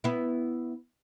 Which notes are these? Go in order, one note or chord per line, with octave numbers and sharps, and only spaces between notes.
B3 E4